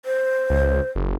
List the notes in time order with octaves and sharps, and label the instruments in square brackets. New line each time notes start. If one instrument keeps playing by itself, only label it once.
[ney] C5
[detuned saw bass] C#2
F#1